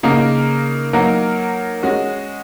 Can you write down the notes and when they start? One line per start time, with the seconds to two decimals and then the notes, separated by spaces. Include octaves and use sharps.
0.03 C#3 A#3 D#4 A#4
0.93 F#3 A#3 D#4 A#4
1.83 G#3 C#4 F#4